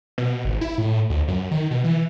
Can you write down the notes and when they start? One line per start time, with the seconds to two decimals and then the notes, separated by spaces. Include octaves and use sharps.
0.18 B2
0.45 G#1
0.61 E4
0.78 A2
1.10 D2
1.28 F#2
1.51 D#3
1.71 B2
1.84 E3